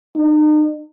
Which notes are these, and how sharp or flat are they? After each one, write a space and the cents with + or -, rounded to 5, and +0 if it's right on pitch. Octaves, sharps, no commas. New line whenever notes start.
D#4 -40